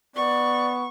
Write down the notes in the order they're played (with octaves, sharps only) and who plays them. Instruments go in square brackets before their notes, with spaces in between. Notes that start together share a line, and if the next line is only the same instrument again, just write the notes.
[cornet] B3 [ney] D5 [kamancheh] C#6